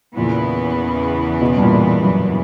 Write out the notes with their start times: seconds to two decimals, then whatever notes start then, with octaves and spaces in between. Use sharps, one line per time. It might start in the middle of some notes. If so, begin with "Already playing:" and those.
0.17 E2 A#2 C#3 E3 B3
1.41 B2
1.57 G2
1.62 A#2
2.03 F#2